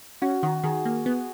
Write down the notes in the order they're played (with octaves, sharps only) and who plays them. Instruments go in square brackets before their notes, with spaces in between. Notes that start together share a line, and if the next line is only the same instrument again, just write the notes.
[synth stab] C#4 [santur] F#4
[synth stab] D#3 [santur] F#4
[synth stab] D#3 [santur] G#4
[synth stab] A#3
B3